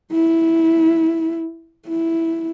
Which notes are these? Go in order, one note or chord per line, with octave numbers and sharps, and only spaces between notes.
E4
E4